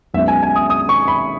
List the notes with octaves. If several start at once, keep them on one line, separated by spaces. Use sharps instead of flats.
B1 B2 G#3 C#4 E5
G#5
G#5
D#6
D#6
C#6
B5